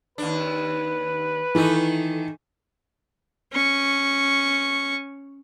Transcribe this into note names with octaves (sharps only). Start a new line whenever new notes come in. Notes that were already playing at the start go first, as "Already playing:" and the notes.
D#2 D4 B4
D#3 E3 A3 D#4
C#4 C#6